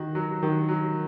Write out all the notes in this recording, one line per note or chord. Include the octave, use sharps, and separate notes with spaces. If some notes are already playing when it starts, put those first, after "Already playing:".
Already playing: D#3 F#4
F#3
D#3
F#3